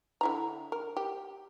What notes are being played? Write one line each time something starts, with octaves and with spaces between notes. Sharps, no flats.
D3 E4 A#5
A#4
G4